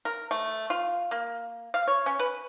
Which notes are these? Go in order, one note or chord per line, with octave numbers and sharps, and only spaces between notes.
A#4
A3
F4
A#3
F5
C#5
C#4
B4